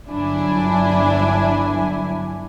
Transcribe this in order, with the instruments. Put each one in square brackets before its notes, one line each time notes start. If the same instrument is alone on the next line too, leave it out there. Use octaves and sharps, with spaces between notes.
[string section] G1 F#3 D4 E4 G#5